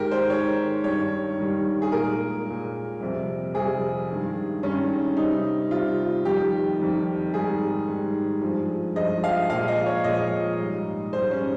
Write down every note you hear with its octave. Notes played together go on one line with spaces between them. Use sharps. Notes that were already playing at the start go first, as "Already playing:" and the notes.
Already playing: G#2 D#3 G#3 G4 A#4
C5
G#2 D#3 G#3 C#5
G2 D#3 G3 C#5
G2 D#3 G3
G#4
A#2 G#3 A#4
A#2 G#3
F2 C3 G3
F2 C3 G3 G#4
G2 D#3 G#3
G2 D#3 G#3 C#4
C3 G3 D#4
C3 G3 F4
F2 D#3 G3 G4
F2 D#3 G3
G#2 D#3 G3 G#4
G#2 D#3 G3
G2 F3 G#3
G2 F3 G#3 D#5
F5
A#2 F3 G#3 F5
D#5
C#5
A#2 F3 G#3 D#5
G#2 G3
G#2 G3 C5
C#4